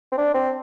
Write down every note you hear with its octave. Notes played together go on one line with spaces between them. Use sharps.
C4
D4
C4